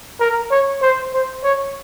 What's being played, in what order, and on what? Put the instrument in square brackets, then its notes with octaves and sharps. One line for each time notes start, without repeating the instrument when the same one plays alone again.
[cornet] A#4
C#5
C5
C5
C#5